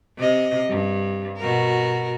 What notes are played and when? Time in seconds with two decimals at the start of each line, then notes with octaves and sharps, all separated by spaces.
0.17 C3 D#5
0.69 G2
1.38 B2 F#4 A#4